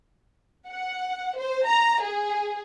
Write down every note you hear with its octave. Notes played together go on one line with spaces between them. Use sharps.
F#5
C5
A#5
G#4